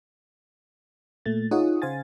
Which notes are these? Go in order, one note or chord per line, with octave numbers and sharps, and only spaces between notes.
A#2 A3 A6
D#4 F4 G#4 C#5 F#5 D#6
C#3 C5 F5 G#5 A6